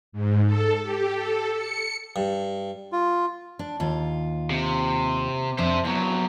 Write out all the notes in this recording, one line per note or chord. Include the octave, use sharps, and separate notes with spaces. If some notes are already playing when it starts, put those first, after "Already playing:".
G#2
A4
G4
A4
C#7
G2
F4
D4
D#2 F4
C3
F2 D4 C5 E5
E2 F#3 E4